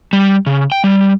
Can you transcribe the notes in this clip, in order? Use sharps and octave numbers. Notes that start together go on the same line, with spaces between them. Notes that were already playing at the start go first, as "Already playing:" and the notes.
G3
C#3
G5
G3